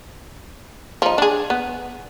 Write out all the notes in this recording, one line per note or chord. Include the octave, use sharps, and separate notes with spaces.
F3 D#4
D4 G#4
B3